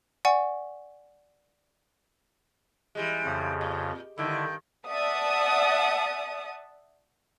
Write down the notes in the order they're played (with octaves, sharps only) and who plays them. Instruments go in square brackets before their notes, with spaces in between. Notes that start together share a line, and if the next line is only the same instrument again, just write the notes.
[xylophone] D5 F#5 G#5 C#6
[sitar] E3 G3 G#3
[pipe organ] F2 C#3
[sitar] A#2
[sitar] G2 D#3 [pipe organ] D3 E4
[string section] D5 E5 F#5 A5 D#6